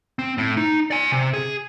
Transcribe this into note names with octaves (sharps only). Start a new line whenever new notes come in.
C4
A2
D#4
D5 G#5
C3
G#4